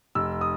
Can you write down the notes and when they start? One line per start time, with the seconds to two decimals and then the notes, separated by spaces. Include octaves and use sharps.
0.15 F1 E6
0.41 D#6